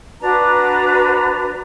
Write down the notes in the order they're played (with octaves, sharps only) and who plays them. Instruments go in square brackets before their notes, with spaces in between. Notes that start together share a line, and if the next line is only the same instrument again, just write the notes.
[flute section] D4 F#4 B4 A#5